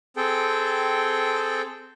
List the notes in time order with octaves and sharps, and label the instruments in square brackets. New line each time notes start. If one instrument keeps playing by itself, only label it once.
[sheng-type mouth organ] C4 G#4 A4 G5